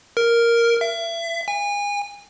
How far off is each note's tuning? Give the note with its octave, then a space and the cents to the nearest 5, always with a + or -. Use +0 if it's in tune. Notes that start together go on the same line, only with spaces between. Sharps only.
A#4 +0
E5 +30
G#5 -30